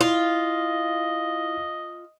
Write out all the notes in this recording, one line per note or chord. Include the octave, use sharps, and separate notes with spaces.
E4 F4 D#5